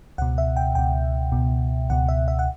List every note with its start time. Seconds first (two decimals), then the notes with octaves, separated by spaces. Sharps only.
0.18 C#2 B2 F#5
0.38 E5
0.57 G5
0.75 C#2 B2 G5
1.32 C#2 B2
1.90 C#2 B2 F#5
2.08 E5
2.28 E5
2.39 F#5